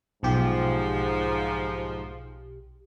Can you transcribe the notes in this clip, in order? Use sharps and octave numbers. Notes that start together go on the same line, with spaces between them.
B1 G#2 F3 G4